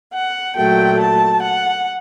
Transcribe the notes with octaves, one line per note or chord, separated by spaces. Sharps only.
F#5
A#2 F#3 A3 G5
A5
F#5